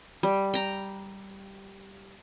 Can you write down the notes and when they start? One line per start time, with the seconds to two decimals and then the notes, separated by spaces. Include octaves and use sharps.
0.23 G3
0.54 G5 A#5